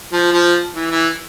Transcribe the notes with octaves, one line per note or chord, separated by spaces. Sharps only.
F3
F3
E3
E3